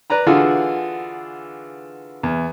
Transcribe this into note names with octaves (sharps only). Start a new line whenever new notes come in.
B4 D5 A#5 B5
D3 E3 F4 F#4 G#4
E2